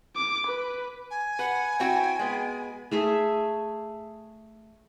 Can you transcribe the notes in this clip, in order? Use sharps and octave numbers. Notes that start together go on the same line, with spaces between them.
D6
B4
G#5
B4 F#5
C4 E4 F#4 G5
G#3 B3
A3 G#4 E5